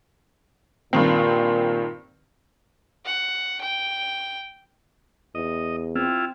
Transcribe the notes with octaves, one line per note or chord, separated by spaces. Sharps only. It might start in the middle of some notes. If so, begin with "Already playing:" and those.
G2 A#2 D#3 C4
F#5
G5
E2 D#5
C4 E4 F4